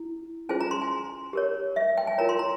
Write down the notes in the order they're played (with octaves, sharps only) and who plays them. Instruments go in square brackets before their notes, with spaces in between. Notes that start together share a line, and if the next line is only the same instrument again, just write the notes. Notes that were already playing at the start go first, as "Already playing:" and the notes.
Already playing: [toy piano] E4
C#4 F4 G#4 C5 G#5
A#5
C6
G#5
G4 A#4 C#5
E5
G5
G#5
F4 A#4 C#5 A#5
C6
A#5